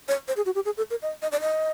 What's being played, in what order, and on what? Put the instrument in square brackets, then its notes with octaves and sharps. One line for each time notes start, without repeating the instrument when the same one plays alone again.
[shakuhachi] C#5
C5
G#4
F#4
G4
G#4
A4
A#4
D#5
D#5
D5
D#5